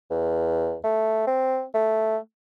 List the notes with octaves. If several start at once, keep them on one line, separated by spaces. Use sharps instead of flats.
E2
A3
C4
A3